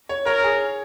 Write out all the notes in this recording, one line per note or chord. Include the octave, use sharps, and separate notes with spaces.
C#5
A#4 C#5
G#4